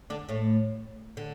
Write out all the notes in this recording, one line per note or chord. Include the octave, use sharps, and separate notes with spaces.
D3 D4
A2 A3
D3